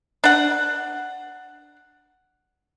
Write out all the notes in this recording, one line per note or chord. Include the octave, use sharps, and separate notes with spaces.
D4 F#5